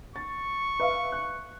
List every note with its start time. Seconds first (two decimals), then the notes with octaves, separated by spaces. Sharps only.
0.16 C#6 A6
0.80 B4 E5 F5
1.12 F#6